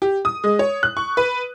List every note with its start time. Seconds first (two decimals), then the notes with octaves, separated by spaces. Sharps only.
0.02 G4
0.25 D#6
0.44 G#3
0.59 C#5
0.83 F#6
0.97 C#6
1.17 B4